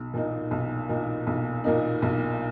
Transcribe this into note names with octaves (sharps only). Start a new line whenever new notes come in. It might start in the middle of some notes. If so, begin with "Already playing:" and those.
Already playing: B1
A#2 A#3 D#4
B1
A#2 A#3 D#4
B1
A#2 A#3 D#4
B1